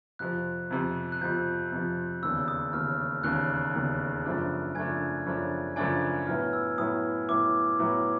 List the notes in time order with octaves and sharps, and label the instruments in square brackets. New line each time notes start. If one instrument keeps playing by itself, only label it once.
[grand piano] F2 C3 F3 [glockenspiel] F#6
[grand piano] F2 C3 F3
[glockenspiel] F#6
[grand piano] F2 C3 F3 [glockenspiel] G6
[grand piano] F2 C3 F3
[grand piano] E1 D#2 C#3 [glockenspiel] E6
[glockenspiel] D#6
[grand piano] E1 D#2 C#3 [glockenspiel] F6
[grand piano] E1 D#2 C#3 [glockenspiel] F#6
[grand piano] E1 D#2 C#3
F#2 C#3 F3 A3 D4
[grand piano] F#2 C#3 F3 A3 D4 [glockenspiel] G#5 G#6
[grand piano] F#2 C#3 F3 A3 D4
[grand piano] F#2 C#3 F3 A3 D4 [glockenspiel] G#5 G#6
[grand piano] A2 F#3 B3 E4 [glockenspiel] F6
[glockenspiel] E6
[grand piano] A2 F#3 B3 E4 [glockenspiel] D#6
[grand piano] A2 F#3 B3 E4 [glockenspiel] D6
[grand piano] A2 F#3 B3 E4